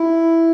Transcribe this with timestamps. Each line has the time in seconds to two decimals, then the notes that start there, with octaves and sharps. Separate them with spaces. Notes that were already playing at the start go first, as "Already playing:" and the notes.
Already playing: E4